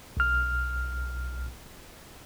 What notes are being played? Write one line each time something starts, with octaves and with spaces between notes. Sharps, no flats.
B1 F6